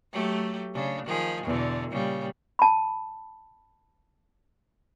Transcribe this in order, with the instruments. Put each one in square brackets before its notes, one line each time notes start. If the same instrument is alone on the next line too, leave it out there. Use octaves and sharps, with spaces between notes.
[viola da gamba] F#3 A3 G4
C#3 D4
D#3 F3 G#4
E2 B2 D3
A#2 C#3 G3
[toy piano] A5 B5